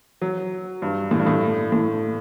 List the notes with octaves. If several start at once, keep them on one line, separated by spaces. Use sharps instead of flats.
F#3
G2
A2
G2
A2
A2